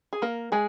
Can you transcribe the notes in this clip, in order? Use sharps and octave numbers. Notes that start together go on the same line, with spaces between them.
G#4
A#3 A#4
G#3 G#4